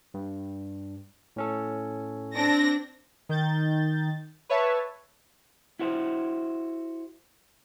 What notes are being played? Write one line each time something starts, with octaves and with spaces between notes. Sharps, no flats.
G2
A2 C#4 A4
C4 D4 A#6
D#3 G6 A6
B4 C#5 E5 A5
E4 F#4 C5